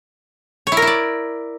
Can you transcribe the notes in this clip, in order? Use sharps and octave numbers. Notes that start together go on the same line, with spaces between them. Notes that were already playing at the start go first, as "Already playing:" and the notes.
C#5
E4
A#4
E4
D5